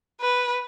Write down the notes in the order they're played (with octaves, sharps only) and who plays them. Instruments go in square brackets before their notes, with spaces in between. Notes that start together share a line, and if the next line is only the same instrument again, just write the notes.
[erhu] B4